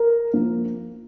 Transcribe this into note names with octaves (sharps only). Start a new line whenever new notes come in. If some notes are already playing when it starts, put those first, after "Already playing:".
Already playing: A#4
F3 A#3